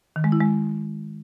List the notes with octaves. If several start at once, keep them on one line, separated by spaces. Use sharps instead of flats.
D#3
G#3
E4
G#3